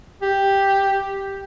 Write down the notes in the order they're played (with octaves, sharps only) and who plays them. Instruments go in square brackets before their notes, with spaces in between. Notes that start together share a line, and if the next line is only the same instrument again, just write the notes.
[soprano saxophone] G4